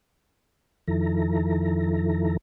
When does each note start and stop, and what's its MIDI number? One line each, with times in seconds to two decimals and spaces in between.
0.88 2.37 41
0.88 2.37 51
0.88 2.37 53
0.88 2.37 64
0.88 2.37 69
0.88 2.37 82